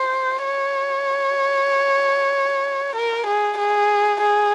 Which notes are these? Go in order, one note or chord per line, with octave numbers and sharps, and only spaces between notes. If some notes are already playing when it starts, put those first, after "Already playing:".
Already playing: C5
C#5
A#4
G#4
G#4
G#4